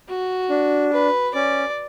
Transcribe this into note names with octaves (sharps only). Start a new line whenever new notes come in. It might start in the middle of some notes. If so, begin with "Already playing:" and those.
F#4
D4
B4
C#4 D5